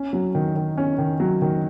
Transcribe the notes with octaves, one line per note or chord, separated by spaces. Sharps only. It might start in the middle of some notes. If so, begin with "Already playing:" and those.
Already playing: C#4
F#3
D#3
D#3
C#4
D#3
F#3
D#3